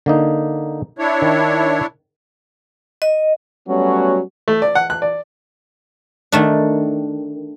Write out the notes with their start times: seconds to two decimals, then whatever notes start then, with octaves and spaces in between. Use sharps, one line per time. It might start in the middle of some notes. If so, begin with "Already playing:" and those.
0.06 D3 A#3 D#4
0.99 D4 E4 C#5
1.22 D#3
3.02 D#5
3.68 F#3 G3 A3 B3 C#4 F#4
4.48 A3
4.62 D5
4.75 F#5
4.90 F#6
5.02 D5
6.32 D#3 A3 D4